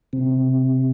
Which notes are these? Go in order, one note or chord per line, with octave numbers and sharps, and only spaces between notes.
C3